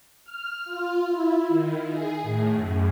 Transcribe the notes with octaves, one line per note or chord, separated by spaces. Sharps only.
F6
F4
E4
D#3
G#4
A2
F#2